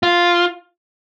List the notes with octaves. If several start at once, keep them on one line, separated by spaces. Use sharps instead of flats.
F4